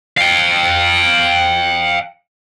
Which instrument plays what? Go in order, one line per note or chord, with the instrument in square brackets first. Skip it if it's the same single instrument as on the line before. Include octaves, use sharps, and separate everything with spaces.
[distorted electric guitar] F5 G5